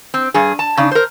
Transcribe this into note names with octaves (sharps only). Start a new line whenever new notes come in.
C4
G2 G#4
A5
C#3 D4 D#4
A#4 C5